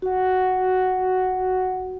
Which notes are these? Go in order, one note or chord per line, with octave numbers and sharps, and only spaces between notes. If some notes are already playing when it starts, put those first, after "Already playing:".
F#4 F#5